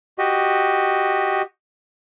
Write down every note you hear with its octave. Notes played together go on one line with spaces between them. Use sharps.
F#4 G4 D#5